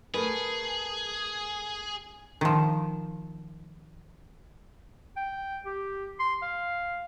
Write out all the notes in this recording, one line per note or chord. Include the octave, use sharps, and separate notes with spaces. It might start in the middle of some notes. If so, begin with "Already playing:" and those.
A3 G#4 A#4 B4
D#3 F3
G5
G4
C6
F5